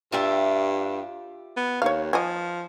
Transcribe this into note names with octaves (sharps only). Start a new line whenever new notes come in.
G2 F4 G4 E5
B3
D#2 C#5 F5
F3 D#5 G#5